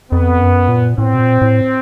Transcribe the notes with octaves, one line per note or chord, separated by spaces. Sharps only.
F2 B3
F#2
A#2
A2 C4
B2
A#2
A2